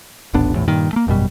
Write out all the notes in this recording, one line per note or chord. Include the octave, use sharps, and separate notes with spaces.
D#1 A1 B3 D4
A#1 E2 A2
G2 A#2 D#3
A3 A#3
G#1 F#2 B2 G3